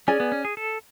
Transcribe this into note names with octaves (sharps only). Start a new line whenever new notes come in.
C#4 G#4 D5 G#5
B3
C#4
G#4
A4